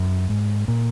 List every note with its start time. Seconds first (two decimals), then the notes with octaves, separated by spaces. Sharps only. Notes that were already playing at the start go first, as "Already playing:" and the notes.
Already playing: F#2
0.29 G#2
0.68 A#2